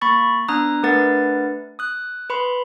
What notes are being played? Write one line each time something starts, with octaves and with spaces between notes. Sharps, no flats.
A#3 B5 C#6 A6
B3 D4 A#5 D#6 F#6
A3 D4 A#4 B4 F#5 A6
D#6 F#6
B4 B5 C6